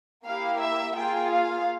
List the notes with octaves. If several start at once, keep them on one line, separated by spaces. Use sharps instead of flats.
A#3 E4 G4 F5
E5
A#3 F4 G#4 G5
F5